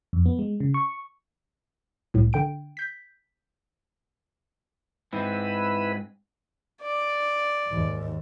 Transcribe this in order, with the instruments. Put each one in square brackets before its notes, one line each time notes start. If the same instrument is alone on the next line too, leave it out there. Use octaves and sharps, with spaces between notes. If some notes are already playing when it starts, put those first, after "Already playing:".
[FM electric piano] F2
B3
G#3
C#3
C#6
[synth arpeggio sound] C2 A2
D3 G5 D7
G6 B6
[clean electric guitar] G#2 C4 [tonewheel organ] E4 B4
[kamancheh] D5
[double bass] D#2 G#2